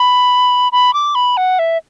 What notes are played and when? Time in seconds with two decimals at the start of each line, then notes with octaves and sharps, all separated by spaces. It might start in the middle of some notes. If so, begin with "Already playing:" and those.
Already playing: B5
0.72 B5
0.93 D6
1.15 B5
1.37 F#5
1.59 E5